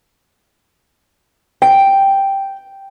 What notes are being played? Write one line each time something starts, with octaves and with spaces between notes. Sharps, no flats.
G5